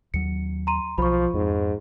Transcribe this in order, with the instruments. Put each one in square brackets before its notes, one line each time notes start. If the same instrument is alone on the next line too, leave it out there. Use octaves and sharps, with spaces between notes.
[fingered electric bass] D#2 F#3 [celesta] C#7
[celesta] A#5 C6 D#7
[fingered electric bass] B1 [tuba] F3 [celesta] B5 C#6
[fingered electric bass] F2 [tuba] G#2